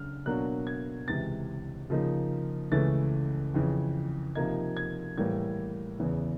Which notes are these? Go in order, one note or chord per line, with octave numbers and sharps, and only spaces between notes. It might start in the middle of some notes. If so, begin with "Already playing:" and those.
Already playing: C#3 F#3 D4 F6
B2 F#3 A#3 D4 F#6
G#6
C#2 C3 E3 A6
C#3 F3 A#3 D#4
C#2 C#3 E3 A3 C#4 A6
F2 C#3 E3
C3 F3 A#3 D#4 G#6
G#6
A2 E3 G3 A#3 G#6
E2 C#3 E3